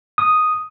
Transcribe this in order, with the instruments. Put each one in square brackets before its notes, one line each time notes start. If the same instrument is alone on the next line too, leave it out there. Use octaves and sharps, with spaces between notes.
[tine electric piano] D#6